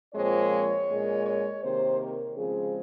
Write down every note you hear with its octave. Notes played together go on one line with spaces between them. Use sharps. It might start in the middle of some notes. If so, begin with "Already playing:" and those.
A#2 F3 G#3 C4 C#5
A#2 G#3 C#4
C#5
C3 D#3 A#3 C5
A#4
C#3 F3 G#3 C4 G#4